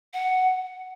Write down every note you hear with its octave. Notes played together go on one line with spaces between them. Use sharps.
F#5